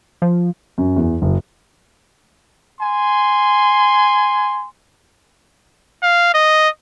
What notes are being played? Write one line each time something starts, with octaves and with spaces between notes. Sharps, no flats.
F3
F#2
E2
F#1
G#5 C6
F5
D#5